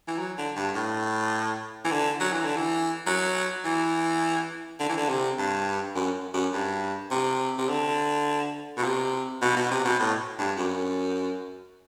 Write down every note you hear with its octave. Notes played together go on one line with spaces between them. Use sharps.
E3
F#3
D3
G2
A2
E3
D3
F#3
E3
D3
E3
F#3
E3
D3
E3
D3
C3
G2
F#2
F#2
G2
C3
C3
D3
B2
C3
B2
B2
C3
B2
A2
G2
F#2